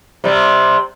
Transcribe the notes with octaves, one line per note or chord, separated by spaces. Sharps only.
C3 G3